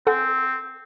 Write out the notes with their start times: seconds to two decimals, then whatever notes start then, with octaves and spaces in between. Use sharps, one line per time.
0.07 C4 A4 F#5 G#5